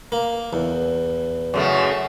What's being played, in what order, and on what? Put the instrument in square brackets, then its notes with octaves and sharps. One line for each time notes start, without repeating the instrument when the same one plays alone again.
[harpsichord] A#3
E2
[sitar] F#2 C#3 A3